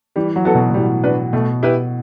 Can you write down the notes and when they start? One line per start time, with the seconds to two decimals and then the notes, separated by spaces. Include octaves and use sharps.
0.16 E3 G3
0.36 F#3
0.45 B3 F#4 A4
0.55 B2
0.70 B2
0.74 A2 G3
1.04 D4 F#4 B4
1.33 B2 A3
1.63 E4 G4 B4